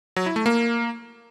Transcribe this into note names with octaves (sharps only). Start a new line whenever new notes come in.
F#3
E4
A3
A#3